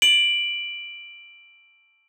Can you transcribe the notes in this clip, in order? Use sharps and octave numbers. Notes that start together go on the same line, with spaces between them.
D7 F#7